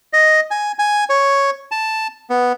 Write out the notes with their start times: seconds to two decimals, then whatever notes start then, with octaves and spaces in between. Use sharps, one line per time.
0.13 D#5
0.51 G#5
0.79 G#5
1.10 C#5
1.71 A5
2.30 B3